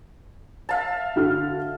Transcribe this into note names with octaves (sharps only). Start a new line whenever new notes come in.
E5 F5 A5
D3 F#4 F6